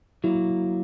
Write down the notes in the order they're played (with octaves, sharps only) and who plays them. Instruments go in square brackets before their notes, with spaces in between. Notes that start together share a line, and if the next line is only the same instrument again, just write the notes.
[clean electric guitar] F#3 A#3 [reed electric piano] E4